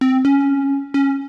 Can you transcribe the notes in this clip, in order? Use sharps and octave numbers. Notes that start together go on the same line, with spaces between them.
C4
C#4
C#4